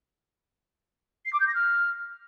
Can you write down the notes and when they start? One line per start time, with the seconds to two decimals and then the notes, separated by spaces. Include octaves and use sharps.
1.26 C7
1.33 D6
1.40 G6
1.47 A#6
1.55 F6